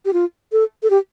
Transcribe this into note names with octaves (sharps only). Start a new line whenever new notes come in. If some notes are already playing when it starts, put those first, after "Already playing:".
G4
F4
A4
A4
G4